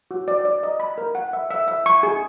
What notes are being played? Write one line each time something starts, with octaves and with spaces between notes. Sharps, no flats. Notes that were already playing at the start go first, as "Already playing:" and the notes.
F#4
D5
D5
D#5
B5
A#4
F#5
E5
E5
E5
C#6
G#4